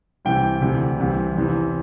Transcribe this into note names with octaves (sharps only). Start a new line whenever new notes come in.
C2 C3 E3 G5
D2 C3 E3
C2 C3 E3
E2 C3 E3